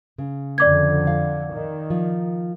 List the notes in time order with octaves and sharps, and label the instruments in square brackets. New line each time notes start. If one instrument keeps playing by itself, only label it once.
[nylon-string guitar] C#3
[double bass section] F2 D3 [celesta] D5 D6 G#6
[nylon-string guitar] F5
[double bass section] D#3
[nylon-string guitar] F3